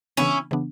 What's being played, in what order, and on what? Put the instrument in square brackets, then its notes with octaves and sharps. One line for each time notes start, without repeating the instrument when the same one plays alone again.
[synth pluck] C#3 E3 B3 D4 [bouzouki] C#4 E4
[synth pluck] C#3 E3 B3 D4